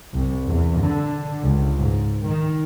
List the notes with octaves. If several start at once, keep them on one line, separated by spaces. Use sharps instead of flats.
C2
E2
D3
C#2
G#2
D#3